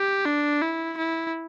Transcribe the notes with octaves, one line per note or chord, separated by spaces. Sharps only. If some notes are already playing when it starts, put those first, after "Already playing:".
Already playing: G4
D4
E4
E4